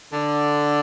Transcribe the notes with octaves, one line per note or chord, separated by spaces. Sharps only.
D3